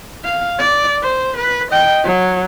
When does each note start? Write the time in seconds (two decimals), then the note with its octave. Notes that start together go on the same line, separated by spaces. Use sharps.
0.25 F5
0.58 D5
1.02 C5
1.36 B4
1.71 D#5 G5
2.04 F#3